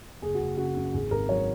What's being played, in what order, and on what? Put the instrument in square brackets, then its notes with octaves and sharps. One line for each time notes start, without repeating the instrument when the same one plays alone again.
[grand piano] F#1 G#4
F#4
F#1
C#3 F#4
F#2
G#1 G#4
G#1 A#4
F#3 C#5